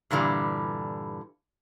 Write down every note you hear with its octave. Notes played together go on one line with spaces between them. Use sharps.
G2 A#2 D3 E3 G3